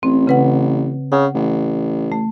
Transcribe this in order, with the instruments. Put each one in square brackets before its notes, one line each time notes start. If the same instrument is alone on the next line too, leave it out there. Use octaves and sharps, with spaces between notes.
[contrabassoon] A1 [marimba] C4
[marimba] C#3 B4 F#5
[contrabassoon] C#3 [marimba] F#5
[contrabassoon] A1
[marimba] A3